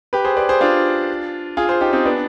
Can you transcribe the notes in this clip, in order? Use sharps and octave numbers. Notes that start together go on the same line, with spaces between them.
G4 B4
G#4 C5
B4 D5
G#4 C5
D4 F4
F4 G#4
G#4 C5
D#4 G4
C4 D#4
B3 D4